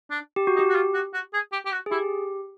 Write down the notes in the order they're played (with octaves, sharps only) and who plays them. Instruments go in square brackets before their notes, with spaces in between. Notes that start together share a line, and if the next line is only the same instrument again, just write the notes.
[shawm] D4
[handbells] G4
F#4
[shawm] D#4
[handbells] G4
[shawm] F#4
F4
F#4
F#4
G#4
G4
G4
F#4
[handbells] G#4
[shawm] E4 [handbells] G4